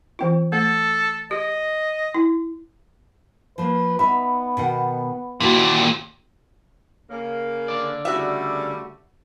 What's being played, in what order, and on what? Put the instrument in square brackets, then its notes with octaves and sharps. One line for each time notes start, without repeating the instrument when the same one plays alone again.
[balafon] E3 C4 F4
[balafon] A3 [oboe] A4
[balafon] G4 [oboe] D#5
[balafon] E4
[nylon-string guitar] F3 A#3 [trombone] B4
[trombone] B3 [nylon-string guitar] D#4 E5 [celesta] B5
[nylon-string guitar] B2 D#3 F#5
[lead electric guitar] D#2 A#2 [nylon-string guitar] A#3 E4 F#4
[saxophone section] C#3 A#3
[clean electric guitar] D3 D5
[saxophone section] C#3 G3 A3 [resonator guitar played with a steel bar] F#4 E5